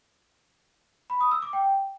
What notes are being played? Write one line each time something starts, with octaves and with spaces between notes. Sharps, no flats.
B5
D#6
E6
D6
G5